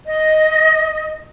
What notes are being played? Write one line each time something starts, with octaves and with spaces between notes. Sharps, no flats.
D#5